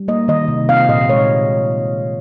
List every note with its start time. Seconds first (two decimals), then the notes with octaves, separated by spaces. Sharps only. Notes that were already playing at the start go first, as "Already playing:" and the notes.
Already playing: G3
0.08 A#3 D#5
0.28 D#3 D#5
0.48 C3
0.69 C4 F5
0.88 A#2 D#5
1.09 G#3 C#5